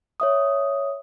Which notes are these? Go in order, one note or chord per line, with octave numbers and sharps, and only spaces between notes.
C#5 E5 D#6